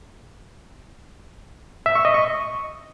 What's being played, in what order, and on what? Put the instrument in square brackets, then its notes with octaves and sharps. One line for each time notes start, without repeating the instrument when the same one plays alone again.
[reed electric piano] E5
C#6
D#5
C#6